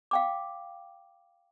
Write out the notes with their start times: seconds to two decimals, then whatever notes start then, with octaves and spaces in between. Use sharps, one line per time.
0.11 F5 G5 D6